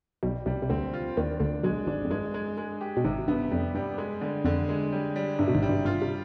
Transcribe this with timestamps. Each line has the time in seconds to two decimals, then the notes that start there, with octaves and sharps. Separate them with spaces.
0.23 B1 B2 G3
0.46 C2 C3 G3
0.62 C3
0.70 D2 D3 C4
0.94 F4
1.17 D#2 D#3 D4
1.40 D2 D3 D4
1.63 B1 B2 G#3
1.87 G#1 G#2 D4
2.05 F2
2.11 G2 G#3
2.34 G#3
2.58 G#3
2.81 G4
2.97 B2
3.05 G#1 G#2 C3
3.28 G2 B3
3.51 F2 G3
3.75 G2 G3
3.98 G#3
4.21 D3
4.45 F2 D3
4.69 G#3
4.92 G3
5.16 G3
5.39 G2 C3
5.48 B2
5.54 G#1 G#2
5.62 G3
5.70 G2
5.85 G2 F4
6.02 C3